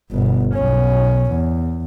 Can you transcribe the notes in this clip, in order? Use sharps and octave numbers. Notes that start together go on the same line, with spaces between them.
G1 B2
B1 C#4
E2